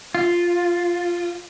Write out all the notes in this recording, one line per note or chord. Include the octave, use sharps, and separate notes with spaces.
F4